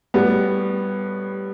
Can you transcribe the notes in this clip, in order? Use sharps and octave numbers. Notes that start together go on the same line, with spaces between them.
A2 G3 B3